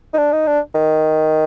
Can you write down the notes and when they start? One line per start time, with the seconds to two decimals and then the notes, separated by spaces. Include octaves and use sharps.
0.14 D#4
0.18 D4
0.32 D#4
0.47 D4
0.75 D#3